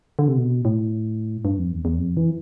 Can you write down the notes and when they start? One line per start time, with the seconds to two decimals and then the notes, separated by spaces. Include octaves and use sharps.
0.19 D3
0.28 C3
0.37 B2
0.65 A2
1.45 G2
1.58 F2
1.72 E2
1.85 E2
1.98 F2
2.17 E3